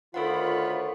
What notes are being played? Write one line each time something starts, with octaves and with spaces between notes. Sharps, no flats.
D2 D#3 F4 A4 A#4 C#5 F#5 B5